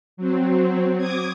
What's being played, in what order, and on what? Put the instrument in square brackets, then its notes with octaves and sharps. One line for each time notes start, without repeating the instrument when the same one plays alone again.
[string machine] F#3 C4
D6 D#6 G#6